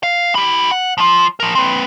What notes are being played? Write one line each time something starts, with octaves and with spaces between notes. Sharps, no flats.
F5
E4 G4
F#5
F3 F4
F3 A#4
C4 B4